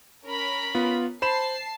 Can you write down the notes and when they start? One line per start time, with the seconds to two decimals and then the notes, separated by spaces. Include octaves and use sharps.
0.24 C#4 A#4 B5
0.75 B3 F4
1.22 C5 A5 B5 C7 E7